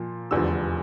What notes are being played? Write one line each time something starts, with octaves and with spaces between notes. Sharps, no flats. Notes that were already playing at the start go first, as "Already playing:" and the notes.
Already playing: A#2 F3
F1 E2 D3 F3 E6